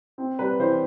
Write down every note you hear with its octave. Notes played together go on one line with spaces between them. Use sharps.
C4
G3 B4
E3 C5